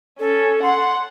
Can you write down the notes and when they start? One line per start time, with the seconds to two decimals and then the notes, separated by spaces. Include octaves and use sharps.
0.19 C#4 A4
0.63 F#5 C6